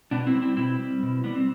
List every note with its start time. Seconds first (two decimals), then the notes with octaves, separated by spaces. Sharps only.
0.11 B2 B3 D4
0.27 C4 E4
0.35 G3
0.42 C4 E4
0.57 B2 C4 E4
0.79 G3
1.03 B2
1.24 G3 B3
1.35 C4